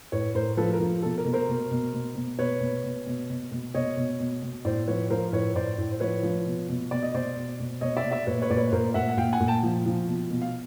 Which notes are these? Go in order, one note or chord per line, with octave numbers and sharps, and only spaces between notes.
A2 B4 C#5
A2 A#4 C5
F3 A4 B4
A#4
F3
B2 A4
A#4
B2
A#4 C5
B2
B2
B2
B2
B2 B4 C#5
B2
B2
B2
B2
B2
B2 C#5 D#5
B2
B2
B2
A2 C5 D5
F3 B4 C#5
F3 A#4 C5
A2 B4 C#5
A2 C5 D5
A2
C5
F3 B4 C#5
F3
B2
B2
B2 D5
D#5
B2 C5 D5
B2
B2
B2 C#5 D#5
D5 E5
B2
D5 E5
A#2 B4 C#5
B4 C#5
A#2 D5
B4 C#5
C#5
A#2 A#4 C5
A#2 E5 F#5
F#5
A#2 F5 G5
F#5 G#5
A#2
G5 A5
F3
F3
B2
B2
F5